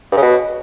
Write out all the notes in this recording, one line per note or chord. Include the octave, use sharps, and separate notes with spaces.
G2
C#3
B2